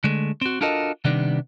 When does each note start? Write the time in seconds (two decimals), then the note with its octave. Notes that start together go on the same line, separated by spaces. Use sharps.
0.04 D3 G#3 A3
0.41 C4 F#4
0.61 D4 F4 F#4 A4 A#4 D#5
1.05 C3 D#3 G3 B3 D4